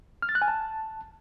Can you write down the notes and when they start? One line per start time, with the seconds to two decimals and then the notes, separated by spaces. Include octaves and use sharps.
0.22 F6
0.29 A6
0.35 F#6
0.42 G#5
0.48 A5